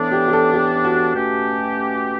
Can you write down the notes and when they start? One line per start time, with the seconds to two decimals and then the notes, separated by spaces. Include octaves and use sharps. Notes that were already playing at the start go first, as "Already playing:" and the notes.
Already playing: A2 E3 B3 D4 A4
0.12 G4
0.28 G4
0.33 A4
0.54 G4
0.84 F#4
1.15 B2 A3 C#4 G4